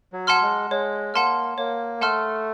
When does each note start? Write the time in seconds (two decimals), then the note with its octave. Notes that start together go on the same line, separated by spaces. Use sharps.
0.13 F#3
0.27 F#5 A5 C6 F6
0.42 G#3
0.70 G#3 C#5
1.14 A#3 F#5 A5 C6 F6
1.58 A#3 C#5
2.01 A3 F#5 A5 C6 F6